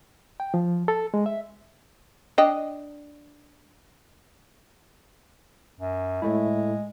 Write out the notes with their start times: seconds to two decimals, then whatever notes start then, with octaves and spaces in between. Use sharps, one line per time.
0.40 G5
0.54 F3
0.88 A4
1.14 G#3
1.26 E5
2.38 D4 D#5 G5
5.80 F#2
6.22 A2 G#3 A3 E4